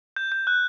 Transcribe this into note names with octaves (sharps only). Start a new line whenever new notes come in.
G6
G6
F#6